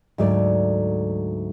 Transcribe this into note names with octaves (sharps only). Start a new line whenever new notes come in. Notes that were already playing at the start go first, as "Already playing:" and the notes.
D2 G#2 F#3 A3 D5